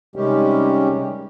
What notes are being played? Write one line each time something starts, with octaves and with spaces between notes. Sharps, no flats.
C3 D#3 G3 G#3 C#4 G4